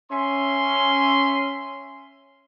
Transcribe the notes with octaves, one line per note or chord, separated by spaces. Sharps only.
C#4 E5 C6